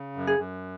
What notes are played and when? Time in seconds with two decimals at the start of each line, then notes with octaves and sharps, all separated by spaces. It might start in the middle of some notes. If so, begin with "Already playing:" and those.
Already playing: C#3
0.16 F#2
0.27 G#4
0.39 F#2